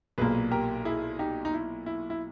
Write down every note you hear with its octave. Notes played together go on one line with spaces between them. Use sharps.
B1 A#2 A#3 G#4 B4
G4 A#4
E4 G#4
D#4 G4
D#4
E4
E4
E4